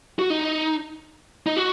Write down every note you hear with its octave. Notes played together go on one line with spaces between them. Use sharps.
F#4
D#4
D#4
F#4